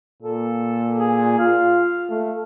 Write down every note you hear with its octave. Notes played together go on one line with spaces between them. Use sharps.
A#2 A4
G#4
F4 F5
A3